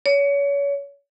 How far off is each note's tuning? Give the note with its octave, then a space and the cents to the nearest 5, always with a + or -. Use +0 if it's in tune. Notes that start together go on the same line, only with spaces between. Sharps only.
C#5 +30